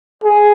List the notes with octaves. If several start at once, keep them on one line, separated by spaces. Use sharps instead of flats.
G#4